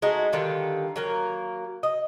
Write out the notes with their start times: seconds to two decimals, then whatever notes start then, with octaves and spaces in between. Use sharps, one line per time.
0.02 G#3 A3 D#4 F#4
0.33 D3 D#3 G3 F4
0.96 F#3 A#3 A#4
1.83 D#5